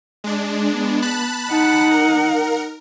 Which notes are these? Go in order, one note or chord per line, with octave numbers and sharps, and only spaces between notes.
G#3 D4
B3
A5 B5 F#6
D#4 F#5
A#4